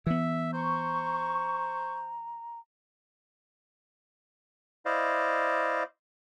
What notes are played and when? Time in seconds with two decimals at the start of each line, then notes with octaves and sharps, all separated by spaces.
0.07 E3 B3 E5
0.53 C5 A#5 C#6
4.86 E4 C5 D5 D#5 F5